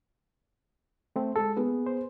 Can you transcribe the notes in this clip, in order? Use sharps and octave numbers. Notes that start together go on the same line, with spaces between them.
A3 C4
G#3 A4
A#3 B3 G#4
C5